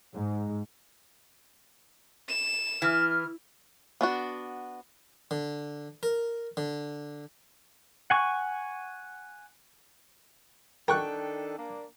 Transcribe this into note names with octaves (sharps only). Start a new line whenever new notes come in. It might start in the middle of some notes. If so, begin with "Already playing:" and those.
G#2
E7
E3 F6
B3 D4 F#4
D3
A#4
D3
F#5 G#5 C#6
D#3 D4 A4 A#4 G5 C#6 F#6
A#3 D4